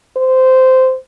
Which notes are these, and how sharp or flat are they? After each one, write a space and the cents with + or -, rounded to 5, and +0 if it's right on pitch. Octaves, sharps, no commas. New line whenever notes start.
C5 -15